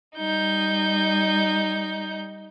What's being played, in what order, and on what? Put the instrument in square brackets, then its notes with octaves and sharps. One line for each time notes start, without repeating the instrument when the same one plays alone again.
[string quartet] G3 D#4 G6